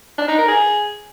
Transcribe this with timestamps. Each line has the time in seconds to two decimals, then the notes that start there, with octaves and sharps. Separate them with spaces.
0.18 D4
0.28 D#4
0.38 A#4
0.48 G#4